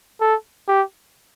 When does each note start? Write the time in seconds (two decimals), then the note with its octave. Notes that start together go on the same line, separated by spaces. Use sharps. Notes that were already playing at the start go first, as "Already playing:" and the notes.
0.21 A4
0.68 G4